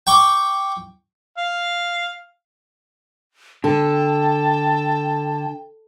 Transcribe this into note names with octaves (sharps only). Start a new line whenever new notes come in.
G5 C#6 D6
F5
D3 A4 G5 A5